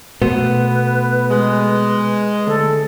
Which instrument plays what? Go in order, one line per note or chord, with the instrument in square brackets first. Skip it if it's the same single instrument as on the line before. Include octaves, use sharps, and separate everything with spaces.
[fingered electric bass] B2 [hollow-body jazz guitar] A3 B3 C5 [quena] B4
[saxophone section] G#3
[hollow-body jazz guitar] D2 [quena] A4